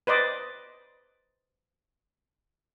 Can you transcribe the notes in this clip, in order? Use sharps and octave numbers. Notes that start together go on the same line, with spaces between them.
B4 C5 D5 D#5